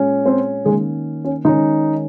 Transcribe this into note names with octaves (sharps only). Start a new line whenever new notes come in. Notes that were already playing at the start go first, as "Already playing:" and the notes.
Already playing: A#2 G#3 C#4
C4 C5
D#3 G#3 A#3 C#4 G#4
C#4
D#3 G#3 C#4 D#4